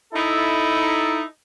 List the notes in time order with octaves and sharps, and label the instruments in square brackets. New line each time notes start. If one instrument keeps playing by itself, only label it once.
[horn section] D#4 E4 A4